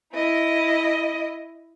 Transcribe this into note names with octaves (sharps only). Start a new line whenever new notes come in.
E4 D#5